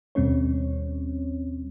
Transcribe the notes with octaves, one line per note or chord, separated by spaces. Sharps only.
D#2 B2 G3 C4 C#4 C#5